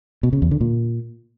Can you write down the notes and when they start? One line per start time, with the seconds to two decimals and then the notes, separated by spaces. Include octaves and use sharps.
0.23 B2
0.33 C#3
0.42 E2
0.51 D3
0.61 A#2